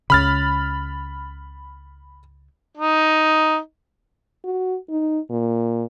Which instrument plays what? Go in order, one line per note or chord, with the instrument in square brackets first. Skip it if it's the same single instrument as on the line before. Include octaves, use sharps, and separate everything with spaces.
[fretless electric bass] C#2 C#3 [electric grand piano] B5 F6 A6
[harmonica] D#4
[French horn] F#4
D#4
A#2